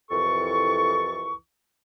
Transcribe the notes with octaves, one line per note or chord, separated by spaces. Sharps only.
C2 F2 E3 A4 C#6